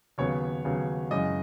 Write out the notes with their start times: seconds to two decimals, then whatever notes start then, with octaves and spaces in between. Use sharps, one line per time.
0.18 D#2 C#3 F#3 B3 C#5
0.65 D#2 C#3 F#3 B3
1.11 F#2 C#3 E3 G#3 D#5